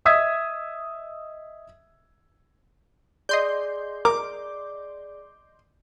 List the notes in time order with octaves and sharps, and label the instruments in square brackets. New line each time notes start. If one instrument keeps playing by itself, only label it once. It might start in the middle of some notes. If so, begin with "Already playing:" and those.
[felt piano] D#5 E5 D#6 E6 G#6 B6
[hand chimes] G#4 D5 [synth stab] D#5 C6 G6
[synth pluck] A#4 [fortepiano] D6